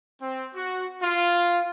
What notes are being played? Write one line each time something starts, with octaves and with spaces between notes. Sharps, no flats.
C4
F#4
F4